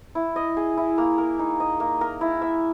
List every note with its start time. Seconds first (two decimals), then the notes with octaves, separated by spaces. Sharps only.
0.15 E4
0.36 D#5
0.57 G#4
0.77 E4
0.98 A#3
1.18 A#4
1.39 D#4
1.60 D#5
1.80 A#3
2.01 A#4
2.21 E4
2.42 E5